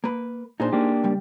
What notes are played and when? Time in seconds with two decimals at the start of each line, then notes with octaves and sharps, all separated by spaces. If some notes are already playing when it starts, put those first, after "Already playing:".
0.04 A#3 B4
0.60 A#2 D4 D#4 G#4 C5
0.73 A#3 D4 G4
1.04 C#2 G3